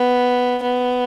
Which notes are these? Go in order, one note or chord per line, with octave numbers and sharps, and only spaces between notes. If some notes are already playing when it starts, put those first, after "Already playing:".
Already playing: B3
B3